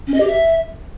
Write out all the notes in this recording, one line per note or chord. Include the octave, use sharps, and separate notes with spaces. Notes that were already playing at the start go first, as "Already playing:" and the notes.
C#4
D#5
G4
E5